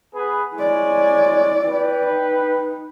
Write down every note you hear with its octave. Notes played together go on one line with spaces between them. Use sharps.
B3 G#4 B4
G#3 E4 C#5 D5 G#5
B4 G5
D#4